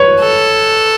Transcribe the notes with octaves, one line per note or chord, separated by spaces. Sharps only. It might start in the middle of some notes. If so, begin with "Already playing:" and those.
Already playing: B4 C#5
A4